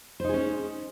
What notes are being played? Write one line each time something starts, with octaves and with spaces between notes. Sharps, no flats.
C#4 D#4 G#4 C5